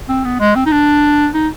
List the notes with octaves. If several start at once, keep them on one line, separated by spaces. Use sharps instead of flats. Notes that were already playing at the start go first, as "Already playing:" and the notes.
C4
B3
G#3
C4
D#4
D4
D#4